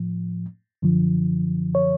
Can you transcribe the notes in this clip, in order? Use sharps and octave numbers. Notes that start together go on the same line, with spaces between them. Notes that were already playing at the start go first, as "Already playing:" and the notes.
Already playing: A2 F3
F#2 D3 F3
C#5